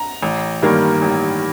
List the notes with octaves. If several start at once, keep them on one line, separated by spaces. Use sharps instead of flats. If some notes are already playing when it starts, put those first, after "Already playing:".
Already playing: A#5
A1
G2 D#3 G3 A#3
A1